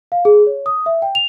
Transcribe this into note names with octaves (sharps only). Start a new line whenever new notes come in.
F5
G#4
C#5
D#6
E5
G5
F7